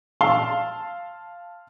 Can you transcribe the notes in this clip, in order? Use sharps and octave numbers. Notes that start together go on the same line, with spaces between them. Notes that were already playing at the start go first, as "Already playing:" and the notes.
F5 A5 C6 E6 G7